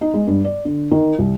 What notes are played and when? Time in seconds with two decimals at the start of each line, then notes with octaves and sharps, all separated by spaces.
0.01 D#4
0.14 G#3
0.27 G2
0.44 D5
0.65 D3
0.91 D#3
1.18 C2